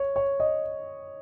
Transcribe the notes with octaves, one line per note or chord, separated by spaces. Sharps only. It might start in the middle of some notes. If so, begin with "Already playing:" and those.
Already playing: C#5
C#5
D#5